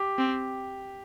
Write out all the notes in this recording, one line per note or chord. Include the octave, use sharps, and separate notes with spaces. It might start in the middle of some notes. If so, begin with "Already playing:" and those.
Already playing: G4
C4